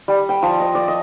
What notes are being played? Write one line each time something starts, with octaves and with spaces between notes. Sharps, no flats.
G3
G5
F3
D#5
D5
D#5